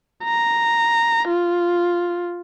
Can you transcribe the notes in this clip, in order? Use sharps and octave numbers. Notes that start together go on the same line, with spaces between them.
A#5
F4